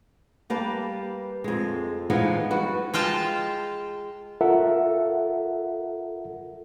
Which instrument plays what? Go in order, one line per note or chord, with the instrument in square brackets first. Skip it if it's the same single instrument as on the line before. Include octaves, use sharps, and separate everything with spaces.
[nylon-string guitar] G3 A#3 G4 B4 A5
F2 G#3
E3 F3 G#3 B3 D#4
G3 F#4 B4
[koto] G#3 F4 G5 A5
[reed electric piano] F4 A4 A#4 E5 F#5